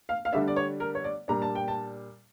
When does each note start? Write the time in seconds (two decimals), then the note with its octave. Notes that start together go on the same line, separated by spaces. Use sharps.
0.09 F5
0.25 F5
0.32 D3 G3 D4 E5
0.48 D5
0.56 C#5
0.80 A#4
0.95 C#5
1.04 D5
1.28 A#2 G3 D4 A#5
1.42 A5
1.55 G5
1.68 A5